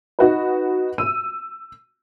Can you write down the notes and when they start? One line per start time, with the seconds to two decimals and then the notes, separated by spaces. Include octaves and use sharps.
0.19 D#4 F#4 B4
0.98 E6 D#7